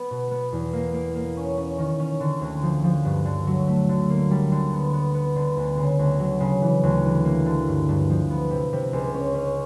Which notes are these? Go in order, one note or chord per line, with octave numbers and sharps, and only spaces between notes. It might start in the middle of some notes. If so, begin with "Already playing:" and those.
Already playing: B3
B2
B3
E2
A#3
A#3
A#3
C#4
C#4
D#3
C#4
D3
D2
F3
F3
G2
D3
F#3
A3
D3
A#3
G3
D3
B3
B3
B3
D3
D2
C#3
D2
F#3
C#3
E3
D2
E3
A#3
D3
G2
G2
F3
B3
C3
C3
C#2
C#4
C#4